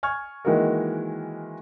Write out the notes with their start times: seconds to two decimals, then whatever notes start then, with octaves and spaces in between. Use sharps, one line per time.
0.03 G#5 C#6 F6 G#6
0.45 D#3 E3 G#3 A#3 F#4 A#4